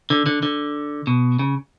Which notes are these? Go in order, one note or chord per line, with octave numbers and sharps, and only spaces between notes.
D3
D3
D3
B2
C#3